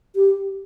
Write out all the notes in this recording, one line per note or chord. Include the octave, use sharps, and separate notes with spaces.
G4